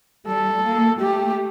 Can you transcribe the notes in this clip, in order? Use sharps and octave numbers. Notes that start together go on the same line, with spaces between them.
G3 A4
A#3
A3 G4